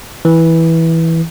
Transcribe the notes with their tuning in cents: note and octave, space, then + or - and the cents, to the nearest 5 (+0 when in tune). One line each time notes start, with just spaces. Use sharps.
E3 -10